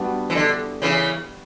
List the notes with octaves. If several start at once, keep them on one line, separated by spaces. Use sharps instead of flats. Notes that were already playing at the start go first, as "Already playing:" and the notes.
Already playing: G3 B3 D4 F#4
E3
D3
C#3 E3